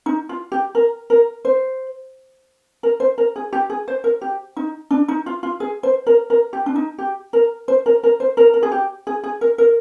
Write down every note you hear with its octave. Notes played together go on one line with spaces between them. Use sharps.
D#4
F4
G4
A#4
A#4
C5
A#4
C5
A#4
G#4
G4
G#4
C5
A#4
G4
D#4
D4
D#4
F4
F4
G#4
C5
A#4
A#4
G4
D4
D#4
G4
A#4
C5
A#4
A#4
C5
A#4
A#4
G#4
G4
G#4
G#4
A#4
A#4